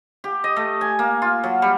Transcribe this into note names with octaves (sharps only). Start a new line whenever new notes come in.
G4
D#5
A3
G#5
A#3
F4
F#3
G3